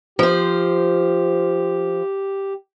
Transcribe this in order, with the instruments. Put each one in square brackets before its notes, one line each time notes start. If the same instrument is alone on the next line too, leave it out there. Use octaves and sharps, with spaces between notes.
[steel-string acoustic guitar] F3 C5 [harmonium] G4